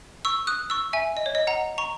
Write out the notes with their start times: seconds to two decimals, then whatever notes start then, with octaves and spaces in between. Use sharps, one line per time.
0.25 C#6 E6
0.47 D#6 F#6
0.70 C#6 E6
0.93 E5 G#5
1.17 D#5
1.26 C#5
1.35 D#5
1.47 F#5 A#5
1.78 A#5 C#6